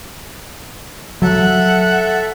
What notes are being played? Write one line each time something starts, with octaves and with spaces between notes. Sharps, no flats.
F#3 A4 E5 F#5